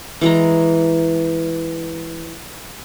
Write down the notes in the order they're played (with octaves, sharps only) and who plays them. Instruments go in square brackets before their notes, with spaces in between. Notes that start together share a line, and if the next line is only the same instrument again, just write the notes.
[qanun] E3 G#3 A#5